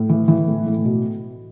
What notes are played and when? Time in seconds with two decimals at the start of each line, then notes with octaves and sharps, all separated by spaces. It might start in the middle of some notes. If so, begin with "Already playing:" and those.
Already playing: A2
0.09 E3
0.28 E3
0.48 A2
0.67 A2
0.85 B2